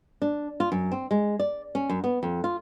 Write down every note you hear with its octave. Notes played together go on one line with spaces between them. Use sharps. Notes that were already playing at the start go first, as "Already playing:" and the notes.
D4
F4
F#2
C4
G#3
D5
C#4
F#2
B3
F2
F4